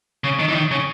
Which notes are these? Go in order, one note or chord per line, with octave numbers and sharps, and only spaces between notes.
C#3
D#3
E3
D#3
C#3